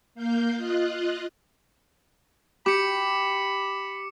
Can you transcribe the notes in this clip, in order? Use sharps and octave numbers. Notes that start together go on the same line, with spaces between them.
A#3 F5 G6
F4 D#5 F#6
G4 B5 D6 C#7